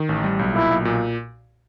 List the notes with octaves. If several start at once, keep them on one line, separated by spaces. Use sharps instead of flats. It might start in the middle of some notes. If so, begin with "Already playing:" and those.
Already playing: D#3
A1
G3
B1
A#2 E4
B1
A#2